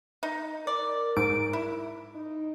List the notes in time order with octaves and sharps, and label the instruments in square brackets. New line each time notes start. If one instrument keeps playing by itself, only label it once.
[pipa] D#4
[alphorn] A#4 [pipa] D5
[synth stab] G#2 D7
[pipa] E4
[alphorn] D#4